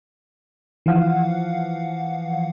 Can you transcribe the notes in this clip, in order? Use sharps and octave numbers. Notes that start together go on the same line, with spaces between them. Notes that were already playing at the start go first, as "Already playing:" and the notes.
E3 F3 F5 F#5